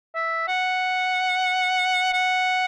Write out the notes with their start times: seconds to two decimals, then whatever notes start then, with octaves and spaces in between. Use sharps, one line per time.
0.15 E5
0.48 F#5
2.13 F#5